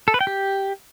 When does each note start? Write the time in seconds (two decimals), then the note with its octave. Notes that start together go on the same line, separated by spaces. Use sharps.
0.08 A4
0.14 B4
0.21 G5
0.27 G4